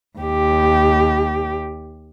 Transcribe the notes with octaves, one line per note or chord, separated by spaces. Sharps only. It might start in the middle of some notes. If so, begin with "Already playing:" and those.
D#2 G4